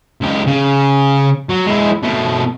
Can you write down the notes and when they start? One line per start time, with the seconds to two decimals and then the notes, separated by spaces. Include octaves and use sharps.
0.21 C#2 G4
0.47 C#3
1.49 F#3
1.67 G#3 E4
2.03 B2 A3